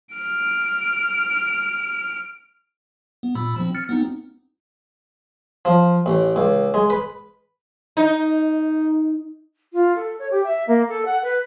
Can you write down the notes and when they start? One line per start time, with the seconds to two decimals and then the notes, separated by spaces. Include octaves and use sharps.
0.15 F6 D7
3.23 B3
3.35 A#2 B5 E6
3.56 F3 C4
3.75 F6 A6 C#7
3.89 B3 C4 D#4
5.65 F3
6.06 A1
6.36 C#2
6.74 G#3
6.90 B4
7.97 D#4
9.73 F4
9.96 A4
10.19 C#5
10.31 G4
10.44 E5
10.68 A#3
10.89 A4
11.06 F#5
11.23 B4